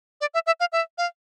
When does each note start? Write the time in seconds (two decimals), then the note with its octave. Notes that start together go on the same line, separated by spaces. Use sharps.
0.21 D5
0.34 E5
0.47 E5
0.60 F5
0.73 E5
0.98 F5